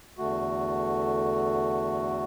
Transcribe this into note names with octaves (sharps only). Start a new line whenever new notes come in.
E2 D3 A3 F#4